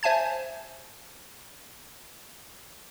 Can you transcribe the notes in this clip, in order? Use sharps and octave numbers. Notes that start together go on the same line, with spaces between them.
C5 E5 G#5 A5 G#6